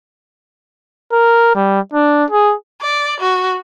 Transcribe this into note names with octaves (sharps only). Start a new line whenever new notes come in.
A#4
G3
D4
G#4
D5
F#4